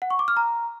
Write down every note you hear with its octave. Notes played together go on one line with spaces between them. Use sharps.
F#5
C#6
D6
F6
A#5